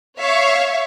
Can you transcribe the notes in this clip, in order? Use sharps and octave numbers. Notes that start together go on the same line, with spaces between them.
C#5 E5 F5 C#6